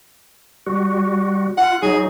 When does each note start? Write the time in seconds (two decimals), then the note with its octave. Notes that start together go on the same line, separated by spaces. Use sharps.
0.66 G3 F#4
1.58 F4 F#5
1.82 F#3 D#4 G#4